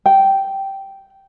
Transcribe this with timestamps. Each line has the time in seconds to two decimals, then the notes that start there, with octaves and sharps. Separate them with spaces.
0.06 G5